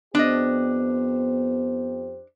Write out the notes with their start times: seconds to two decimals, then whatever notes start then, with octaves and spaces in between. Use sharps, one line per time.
0.15 F2 B3 D4 G4 C5 D#5